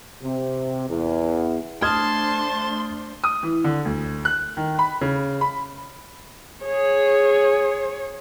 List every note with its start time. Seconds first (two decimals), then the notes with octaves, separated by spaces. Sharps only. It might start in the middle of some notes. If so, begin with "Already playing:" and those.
0.22 C3
0.89 E2
1.82 A3 D4 C5 A5 C6 D#6 F6 G#6
3.24 D#6
3.43 E3
3.64 D3
3.85 D2
4.25 F#6
4.57 D#3
4.79 B5
5.01 C#3
5.41 B5
6.65 G#4 C#5